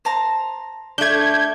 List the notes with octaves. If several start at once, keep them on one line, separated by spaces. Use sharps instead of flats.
C5 A5 A#5
A3 D4 G6 G#6